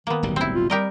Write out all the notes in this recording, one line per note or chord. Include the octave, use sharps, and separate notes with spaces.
D#3 A#3 B3
D1 B1 G3
C4 E4
F4
G3 G4 A#4 D#5